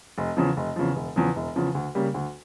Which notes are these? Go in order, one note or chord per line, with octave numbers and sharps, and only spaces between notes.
F1
E2 C#3 F3
F1
E2 C#3 F3
E1
E2 C#3 F3
E1
E2 C#3 F3
D2
C#3 G3 A#3
D2